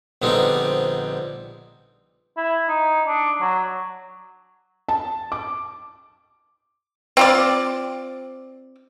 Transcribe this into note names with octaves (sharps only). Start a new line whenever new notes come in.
A#1 D3 G3 B3 C4 D#4
E4
D#4
D4
F#3
A5
D6
C4 F4 D5